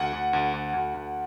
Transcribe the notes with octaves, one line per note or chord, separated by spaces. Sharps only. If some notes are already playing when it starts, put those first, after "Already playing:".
Already playing: D2 F#5
D2
D2
D2
D2
D2